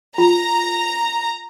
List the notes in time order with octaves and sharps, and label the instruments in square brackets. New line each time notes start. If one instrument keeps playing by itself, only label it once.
[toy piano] F4 [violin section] A#5